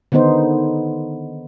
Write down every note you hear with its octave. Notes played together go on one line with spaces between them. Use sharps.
D3 D#3 B3 D#4 C5